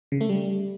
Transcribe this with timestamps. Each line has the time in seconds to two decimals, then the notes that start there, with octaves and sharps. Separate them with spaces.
0.12 C#3
0.21 A3
0.29 G3